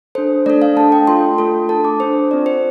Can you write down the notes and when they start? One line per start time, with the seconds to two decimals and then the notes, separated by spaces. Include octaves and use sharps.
0.15 D4 A4 C5
0.46 A3 D4 A4 D5
0.62 F5
0.77 A3 D4 A4 A5
0.92 G5
1.07 A3 F4 A4 C6
1.38 A3 F4 A4
1.69 D4 A4 A5
1.85 D6
2.00 D4 A4 C5
2.31 C4 F4 A4 D5
2.46 C5